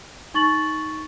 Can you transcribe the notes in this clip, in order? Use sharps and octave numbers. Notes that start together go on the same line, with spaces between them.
D#4 C#6 A6 F#7